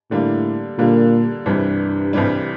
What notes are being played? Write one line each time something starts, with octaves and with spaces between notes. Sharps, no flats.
A2 D3 G3 A#3
A#2 D3 G3 A#3
C2 G2 C3 E3 G3
C2 C3 E3 G3